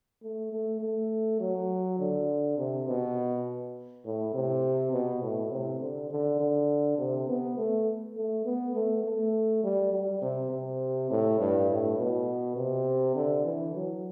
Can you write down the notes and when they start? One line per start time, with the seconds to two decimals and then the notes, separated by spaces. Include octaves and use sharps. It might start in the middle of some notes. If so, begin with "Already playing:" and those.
0.23 A3
0.52 A3
0.81 A3
1.40 F#3
1.99 D3
2.58 C3
2.88 B2
4.05 A2
4.34 C3
4.93 B2
5.23 A2
5.52 C3
5.81 D3
6.10 D3
6.40 D3
6.98 C3
7.28 B3
7.58 A3
8.17 A3
8.45 B3
8.76 A3
9.04 A3
9.64 G3
9.92 G3
10.22 C3
10.51 C3
11.11 A2
11.39 G2
11.69 A2
11.98 B2
12.56 C3
13.15 D3
13.45 E3
13.75 F#3